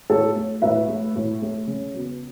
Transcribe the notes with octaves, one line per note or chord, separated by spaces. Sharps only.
A2 A4 C#5
A3
A2 B4 E5
A3
A2
A3
C#3
F#3 B3